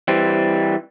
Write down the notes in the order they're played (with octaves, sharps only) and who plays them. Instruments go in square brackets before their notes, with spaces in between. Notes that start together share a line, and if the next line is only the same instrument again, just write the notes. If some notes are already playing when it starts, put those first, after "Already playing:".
[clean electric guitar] E3 G3 C4